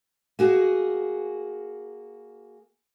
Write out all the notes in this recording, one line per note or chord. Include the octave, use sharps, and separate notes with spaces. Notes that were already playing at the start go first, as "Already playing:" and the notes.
A#3 F#4 G#4